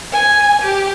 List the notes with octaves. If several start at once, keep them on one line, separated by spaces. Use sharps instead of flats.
G#5
G4